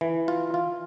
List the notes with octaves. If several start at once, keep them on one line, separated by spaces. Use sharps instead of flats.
E3
F4
F4